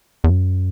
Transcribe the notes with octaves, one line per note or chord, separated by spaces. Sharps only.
E2
F#2